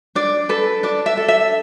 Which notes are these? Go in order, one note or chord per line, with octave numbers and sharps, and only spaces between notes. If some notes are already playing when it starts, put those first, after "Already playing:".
D4 D5
A4 B4
D4 D5
E5
A4
E5